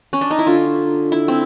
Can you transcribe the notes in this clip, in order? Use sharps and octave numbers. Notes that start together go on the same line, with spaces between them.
C#4
D4
D#4
E4
D3 F4
E4
C4